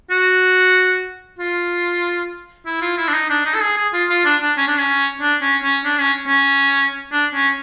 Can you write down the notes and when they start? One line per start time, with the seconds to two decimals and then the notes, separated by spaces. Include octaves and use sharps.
0.10 F#4
1.39 F4
2.66 E4
2.82 F4
2.97 E4
3.08 D4
3.14 D#4
3.30 D4
3.45 D#4
3.55 A4
3.62 G#4
3.77 G#4
3.93 F4
4.09 F4
4.25 D4
4.41 D4
4.57 C#4
4.68 D4
4.79 C#4
5.21 D4
5.42 C#4
5.63 C#4
5.85 D4
5.99 C#4
6.26 C#4
7.12 D4
7.34 C#4